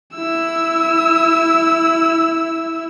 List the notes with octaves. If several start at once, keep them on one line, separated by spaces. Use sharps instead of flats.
E4 E6